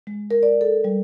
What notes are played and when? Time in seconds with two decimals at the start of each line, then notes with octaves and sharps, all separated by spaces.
0.07 G#3
0.31 A#4
0.43 D5
0.61 A4
0.84 G3